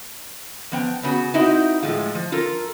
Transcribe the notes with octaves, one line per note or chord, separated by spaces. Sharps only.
F3 B3 G5
C#3 B3 F#4
C4 D#4 E4 F#4
A2 F3 G#3 F4
F3
F4 A4 A#4